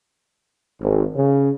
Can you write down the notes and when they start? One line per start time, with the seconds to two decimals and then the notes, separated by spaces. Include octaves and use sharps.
0.81 G#1
1.15 C#3